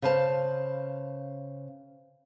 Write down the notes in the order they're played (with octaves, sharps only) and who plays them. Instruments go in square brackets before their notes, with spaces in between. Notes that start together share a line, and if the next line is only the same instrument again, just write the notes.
[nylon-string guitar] C#3 B4 C5 F5 A5